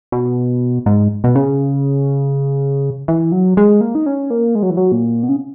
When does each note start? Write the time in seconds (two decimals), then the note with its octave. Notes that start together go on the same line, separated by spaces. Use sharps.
0.12 B2
0.86 G#2
1.24 B2
1.35 C#3
3.08 E3
3.32 F#3
3.57 G#3
3.81 A#3
3.95 D#4
4.06 C#4
4.30 A#3
4.55 G#3
4.63 F#3
4.70 E3
4.77 F#3
4.92 A#2
5.23 B2
5.29 C#3